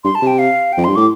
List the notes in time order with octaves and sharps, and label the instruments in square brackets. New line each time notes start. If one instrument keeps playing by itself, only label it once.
[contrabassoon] G2 [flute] C6
[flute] A5
[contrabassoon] C3
[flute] G5
F5
[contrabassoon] F2 [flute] G5
[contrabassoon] G2 [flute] C6
[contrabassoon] A2 [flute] D6